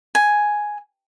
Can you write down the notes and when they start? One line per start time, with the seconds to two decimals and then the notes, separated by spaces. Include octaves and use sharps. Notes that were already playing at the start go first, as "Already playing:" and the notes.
0.15 G#5